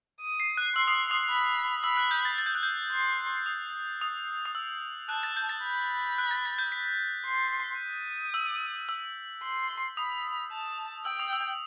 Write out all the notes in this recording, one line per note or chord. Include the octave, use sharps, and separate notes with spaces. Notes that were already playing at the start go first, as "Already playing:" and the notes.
D#6
C7
F#6
C6 E6
D#6
D#6
B5
B5 E6
F#6
G6
A6
A6
G6
F#6
G6
C6
D#6
D#6
D#6
E6
A5 F#6
A6
G6
A6
B5
F#6
A6
A6
G6
B6
C6
D#6
E6
E6
C6
B5 D#6
A5
G5 E6
D#6
E6